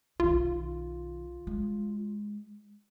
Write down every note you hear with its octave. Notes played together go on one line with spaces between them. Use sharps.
B1 D#3 F4
G#3